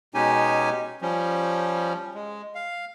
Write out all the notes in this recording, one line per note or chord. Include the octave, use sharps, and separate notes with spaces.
B2 G#3 C#4 D#4 G4 G#5
F3 G3 C#4
G#3
F5